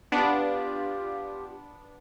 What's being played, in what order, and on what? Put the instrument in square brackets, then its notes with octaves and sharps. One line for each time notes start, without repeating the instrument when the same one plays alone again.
[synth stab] B3 D4 [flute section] F4 G4